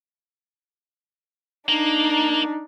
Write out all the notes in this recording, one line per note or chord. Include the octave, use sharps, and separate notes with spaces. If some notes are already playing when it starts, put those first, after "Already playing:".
A#3 D4 D#4